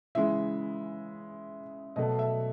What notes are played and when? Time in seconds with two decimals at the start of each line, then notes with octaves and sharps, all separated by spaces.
0.15 C#3 E3 G#3 E5
1.96 B2 F#3 A3 D#5
2.19 E5